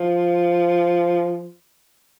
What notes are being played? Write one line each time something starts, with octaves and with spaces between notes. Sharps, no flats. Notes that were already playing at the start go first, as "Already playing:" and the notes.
Already playing: F3